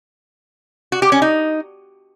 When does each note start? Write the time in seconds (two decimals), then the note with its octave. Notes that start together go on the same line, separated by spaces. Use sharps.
0.92 F#4
1.02 G4
1.12 C#4
1.22 D#4